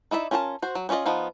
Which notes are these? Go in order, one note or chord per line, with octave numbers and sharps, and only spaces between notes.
D#4 E4 D5 E5
C#4 F4 A#4 D5 A5
F#4 C5
F#3
B3 C#4 F4 D5 D#5
F3 B3 D#4 F5